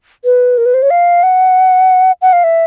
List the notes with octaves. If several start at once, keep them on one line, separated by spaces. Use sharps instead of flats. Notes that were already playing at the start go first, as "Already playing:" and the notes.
B4
A#4
B4
C5
C#5
F5
F#5
F#5
F5
E5